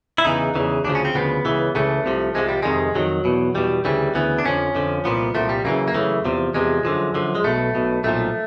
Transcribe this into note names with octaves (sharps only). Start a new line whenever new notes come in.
E4
E2 C#3 E3 D#4
E2 C#3 E3
D2 C#3 F3 D4
C#4
C4
D2 C#3 F3 B3
C#2 C#3 E3
C#2 C#3 E3 A3
C2 C3 F3
C2 C3 F3 G#3
G3
F2 C3 D#3 G#3
F2 C3 D#3 F#3
E2 B2
E2 B2 G3
D2 C#3 E3 G3
D2 C#3 E3 B3
D4
F2 D3 F3 C#4
F2 D3 F3
C2 A#2 F3 B3
C2 A#2 F3 A3
G3
F#2 C#3 E3 A#3
A#3
F#2 C#3 E3 A3
E2 C3 F3
E2 C3 F3 G#3
F#2 D3 F3
F#2 D3 F3
G#3
B1 B2 A3
B1 B2
B1 A#2 F3 A3